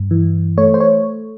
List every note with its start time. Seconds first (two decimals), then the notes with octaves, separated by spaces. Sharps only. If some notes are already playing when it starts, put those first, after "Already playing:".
Already playing: G2
0.11 E3
0.58 A3 C#5
0.74 C5
0.80 C#5